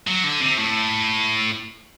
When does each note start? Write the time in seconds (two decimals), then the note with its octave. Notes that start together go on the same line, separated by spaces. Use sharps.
0.07 F#3
0.24 D3
0.41 C3
0.58 A2